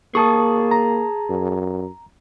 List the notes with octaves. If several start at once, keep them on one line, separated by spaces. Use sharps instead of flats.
A#3 G#4 A5 C#6 D#6
A#5
F#2